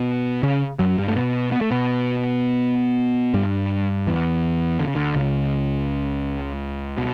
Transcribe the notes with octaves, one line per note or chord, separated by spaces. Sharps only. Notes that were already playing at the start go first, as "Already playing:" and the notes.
Already playing: B2 B3
C#3 C#4
F#2 F#3
G2 G3
A3
B2 B3
B3
A3
B2 B3
G2 G3
E2 E3
D3
C#3
D2 D3
C#2 C#3
B2